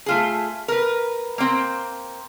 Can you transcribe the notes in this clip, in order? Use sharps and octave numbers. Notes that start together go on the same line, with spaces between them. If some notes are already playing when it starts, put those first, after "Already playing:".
A3 F4 G#4
A#4 B4
A#3 C4